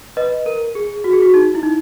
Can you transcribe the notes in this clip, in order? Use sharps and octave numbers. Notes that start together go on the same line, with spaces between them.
B4 D#5
A#4
G#4
F#4
G#4
F#4
D#4
E4
D#4